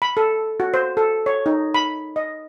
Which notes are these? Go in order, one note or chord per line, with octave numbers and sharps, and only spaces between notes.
B5
A4
F#4
C5
A4
C#5
D#4
B5
D#5